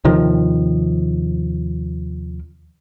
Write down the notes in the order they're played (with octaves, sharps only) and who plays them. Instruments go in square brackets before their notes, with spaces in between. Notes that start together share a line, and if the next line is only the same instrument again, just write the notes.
[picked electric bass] D#2 C3 D#3 F3